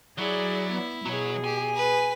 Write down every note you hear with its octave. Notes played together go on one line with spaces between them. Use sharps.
F#3 E4 G#4 D5
B3
B2 F#3 G#4 C#5
G4 G#5
B4